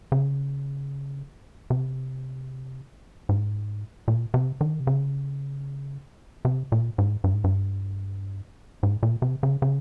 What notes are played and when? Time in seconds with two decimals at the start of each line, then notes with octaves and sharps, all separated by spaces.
0.12 C#3
1.70 C3
3.29 G#2
4.08 A#2
4.34 C3
4.61 D#3
4.80 C3
4.87 C#3
6.45 C3
6.72 A#2
6.98 G#2
7.24 G2
7.34 G#2
7.44 G2
8.83 G#2
9.03 A#2
9.22 C3
9.43 C#3
9.62 C#3